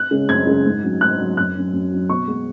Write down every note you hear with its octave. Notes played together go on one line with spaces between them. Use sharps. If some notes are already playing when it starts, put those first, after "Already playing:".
Already playing: F#6
C#3 G#3 C#4
F#2 G#6
C#3 G#3 C#4
G#2
F#3 C#4
G#2 F#6
F#3 C#4
F#2 F#6
F#3 C#4
F#2
F#3 C#4
B2 C#6
G#3 B3